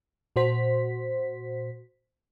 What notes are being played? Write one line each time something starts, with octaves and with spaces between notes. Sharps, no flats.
A#2 F#4 C5 B6